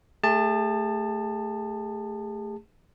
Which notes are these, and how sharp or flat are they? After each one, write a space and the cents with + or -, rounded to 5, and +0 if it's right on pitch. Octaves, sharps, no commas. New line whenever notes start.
A3 +0 G#4 -40 A5 +10